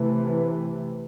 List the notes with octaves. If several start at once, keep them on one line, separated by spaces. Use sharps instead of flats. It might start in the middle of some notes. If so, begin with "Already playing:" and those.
Already playing: C3 E3 A3